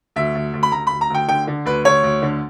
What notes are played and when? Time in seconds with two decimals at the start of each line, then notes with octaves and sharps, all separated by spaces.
0.16 D2 E5
0.35 D2
0.53 D2
0.63 B5
0.72 D2 A#5
0.87 B5
0.92 D2
1.01 A#5
1.10 D2 G5
1.28 D3 G5
1.47 D3
1.65 D2 B4
1.85 D2 C#5
2.03 D2
2.22 D3